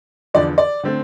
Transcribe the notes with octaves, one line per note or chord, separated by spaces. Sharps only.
E2 D3 F3 D5
D5
D3 A3 C4